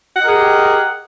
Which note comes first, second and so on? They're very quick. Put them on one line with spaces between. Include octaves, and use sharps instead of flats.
F#5 D#5 A#4 G#4 G4